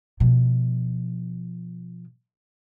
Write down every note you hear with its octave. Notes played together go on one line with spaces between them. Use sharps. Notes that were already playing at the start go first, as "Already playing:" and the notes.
B2 F3